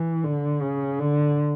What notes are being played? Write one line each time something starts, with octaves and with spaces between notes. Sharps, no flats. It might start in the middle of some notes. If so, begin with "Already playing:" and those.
Already playing: E3
D3
C#3
D3